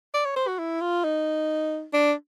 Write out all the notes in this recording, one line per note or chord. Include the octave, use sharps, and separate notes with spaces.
D5
C#5
C5
F#4
E4
F4
D#4
D4